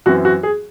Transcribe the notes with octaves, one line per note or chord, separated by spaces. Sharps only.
F#2 E3 C4 F#4
F#4
G#4